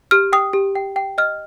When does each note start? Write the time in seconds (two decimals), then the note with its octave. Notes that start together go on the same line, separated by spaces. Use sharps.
0.11 G4 F6
0.33 G5 D#6
0.53 G4
0.75 G5
0.96 G5
1.18 D#5 F6